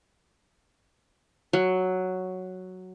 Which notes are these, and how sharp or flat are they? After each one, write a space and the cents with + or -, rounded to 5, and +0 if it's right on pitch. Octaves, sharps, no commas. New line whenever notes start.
F#3 +0